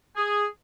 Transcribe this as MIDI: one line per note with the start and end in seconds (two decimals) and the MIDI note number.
0.16 0.46 68